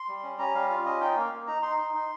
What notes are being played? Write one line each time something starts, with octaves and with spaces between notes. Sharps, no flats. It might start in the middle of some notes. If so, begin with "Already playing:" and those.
Already playing: C6
G3
C#4
C#4 A#5
G3 F5
F4 F5
C#4 D#5
D#4 G5
A#3 F5
A#3
D#4 A#5
D#4 C6
D#4
D#4